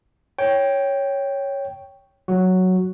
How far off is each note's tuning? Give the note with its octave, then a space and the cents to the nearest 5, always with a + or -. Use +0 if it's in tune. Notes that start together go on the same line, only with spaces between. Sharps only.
C#5 +0 G5 +0
F#3 +0 F#4 +0